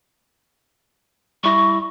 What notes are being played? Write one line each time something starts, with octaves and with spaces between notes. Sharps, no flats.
G3 E4 C#6 A#6